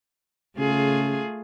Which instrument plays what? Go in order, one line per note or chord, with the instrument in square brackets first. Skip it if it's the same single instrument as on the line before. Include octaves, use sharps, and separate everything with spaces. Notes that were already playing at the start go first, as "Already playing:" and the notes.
[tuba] C#3 [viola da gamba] A3 F4 G#4